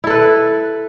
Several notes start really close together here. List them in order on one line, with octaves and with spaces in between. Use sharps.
E4 A4 B4